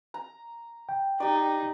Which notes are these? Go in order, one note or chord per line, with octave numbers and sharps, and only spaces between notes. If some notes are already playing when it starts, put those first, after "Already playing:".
A#5
G5
D#4 G4 D5